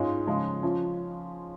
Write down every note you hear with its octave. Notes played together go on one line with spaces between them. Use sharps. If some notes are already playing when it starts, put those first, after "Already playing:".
Already playing: G#2 G#3 C#4 F4
C#3 F3 G#3 F4
F3 C#4 F4